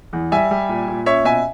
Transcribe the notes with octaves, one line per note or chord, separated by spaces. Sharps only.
E2
G3 E5 G#5
G3
A#2
A#2
C#4 C#5 E5
B2 E5 G#5